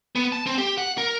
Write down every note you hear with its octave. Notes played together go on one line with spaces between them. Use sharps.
B3
A5
C4
G4
F#5
A#4